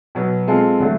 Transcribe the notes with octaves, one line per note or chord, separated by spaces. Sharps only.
B2 F#3 B3
G#3 C4 F4 A4
D3 F#3 A3